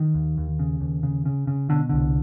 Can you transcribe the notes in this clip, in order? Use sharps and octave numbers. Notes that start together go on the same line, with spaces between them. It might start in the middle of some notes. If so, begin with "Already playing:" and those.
Already playing: D#3
D#2
D#2
C#3
D#2
C#3
C#3
C#3
B2 D3
C2 D3